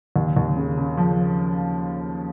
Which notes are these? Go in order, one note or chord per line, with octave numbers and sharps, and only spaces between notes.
D#2
D#2
C#3
C#3
F3